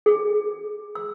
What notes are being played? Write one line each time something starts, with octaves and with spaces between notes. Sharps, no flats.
G#4
E6